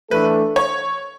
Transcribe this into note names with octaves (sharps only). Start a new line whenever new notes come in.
E3 A3 D4 A4 B4
C#5